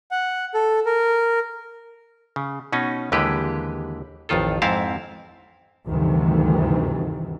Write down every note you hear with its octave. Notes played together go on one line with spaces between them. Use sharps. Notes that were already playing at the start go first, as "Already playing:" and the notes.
F#5
A4
A#4
C#3
B2 C#4 D#4
D#2 D3 E3 G#3 G4 B4
A1 F2 D#3 F4 A4
F2 G#2 C4 E4 F5 A5
D2 G2 C3 D#3 E3